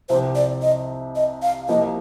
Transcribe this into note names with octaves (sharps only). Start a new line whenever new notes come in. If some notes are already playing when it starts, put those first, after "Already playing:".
C2 C3 F3 C4 G4 C5
D5
D#5
D#5
F5
C2 C3 F3 A#3 D#5